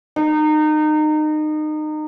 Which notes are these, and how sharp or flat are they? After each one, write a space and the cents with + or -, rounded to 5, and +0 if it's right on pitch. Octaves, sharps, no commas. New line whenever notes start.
D#4 -25